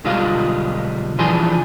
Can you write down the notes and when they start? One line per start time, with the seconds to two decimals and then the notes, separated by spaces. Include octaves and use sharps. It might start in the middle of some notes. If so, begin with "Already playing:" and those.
0.04 B1 D3 G3 G#3 F4 F5
1.18 C#2 E3 F3 D4 G#4 C6